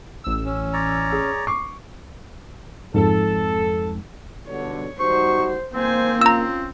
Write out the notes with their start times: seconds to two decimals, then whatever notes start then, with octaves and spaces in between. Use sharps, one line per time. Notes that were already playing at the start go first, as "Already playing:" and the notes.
0.24 A1 E6
0.45 C#4
0.73 C#5 D5 A#5
1.12 G#4
1.47 C#6 D6 C7
2.94 F2 G#2 A4
4.48 G2 B2 D3 C#5
5.00 G3 D#4 F#4 C5 C#6
5.74 A#3 C4 C5 G#5
6.21 C#4 F4 A#5 E6